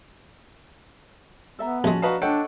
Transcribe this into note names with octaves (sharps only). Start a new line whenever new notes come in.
B3 A4 E5 A#5
A#1 G#3 C#4 F#4 A5
D4 F#4 B4 D#5 F5 A5 A#5
D4 A4 C#5 D#5 F#5 G5